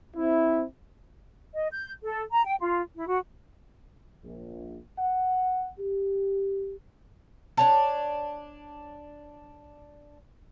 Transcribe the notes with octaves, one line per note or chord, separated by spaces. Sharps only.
C4 E4
D#5
G6
A4
A#5
G5
F4
E4
F#4
A#1
F#5
G4
D4 C#5 A5